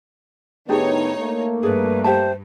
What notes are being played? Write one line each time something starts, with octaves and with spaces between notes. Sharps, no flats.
A2 D#3 B3 D4 D#4 G4 G#4 C#5
A3 A#3
G2 G#4 B4 D5
G4 C5 E5 A5